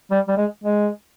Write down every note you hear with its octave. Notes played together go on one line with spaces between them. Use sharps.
G3
G3
G#3
G#3